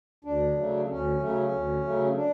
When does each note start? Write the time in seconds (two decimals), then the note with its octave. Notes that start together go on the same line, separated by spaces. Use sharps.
0.24 D2 D4
0.56 C#3 F#3 A3
0.88 D2 C#4
1.20 C#3 F#3 A3
1.52 D2
1.84 C#3 F#3 A3
2.15 D4